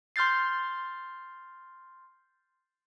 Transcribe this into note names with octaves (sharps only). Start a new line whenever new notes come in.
C6 F6 G6 A6 C7